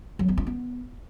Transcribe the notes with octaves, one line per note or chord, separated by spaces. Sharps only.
F#3
B3
F4
B3